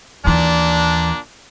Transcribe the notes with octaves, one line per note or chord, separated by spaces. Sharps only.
D#2 A#2 E3 D4